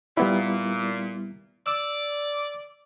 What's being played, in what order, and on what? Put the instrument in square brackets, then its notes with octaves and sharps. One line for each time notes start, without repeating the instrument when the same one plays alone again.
[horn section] A#2 [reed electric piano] G3 B3 E4
[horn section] D5 [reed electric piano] E6